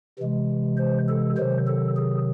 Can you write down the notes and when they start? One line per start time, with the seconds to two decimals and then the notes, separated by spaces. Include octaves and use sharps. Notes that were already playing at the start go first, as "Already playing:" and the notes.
0.19 C3 E3 G#3
0.78 C5
1.08 A4
1.37 C3 D#3 F#3 C5
1.67 A4
1.96 G#4